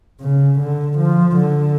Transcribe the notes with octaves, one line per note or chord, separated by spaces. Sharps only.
C#3
D3
F3
D3